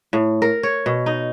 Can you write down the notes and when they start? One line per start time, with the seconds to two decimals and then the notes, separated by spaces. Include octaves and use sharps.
0.13 A2
0.42 A#4
0.63 C#5
0.86 B2
1.06 D#4